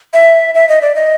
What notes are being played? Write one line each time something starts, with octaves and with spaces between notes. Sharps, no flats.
E5
E5
D#5
D5
D#5